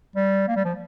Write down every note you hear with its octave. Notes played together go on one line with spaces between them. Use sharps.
G3
A#3
G3
F3